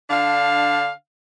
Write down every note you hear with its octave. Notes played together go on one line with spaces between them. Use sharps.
D3 D4 F5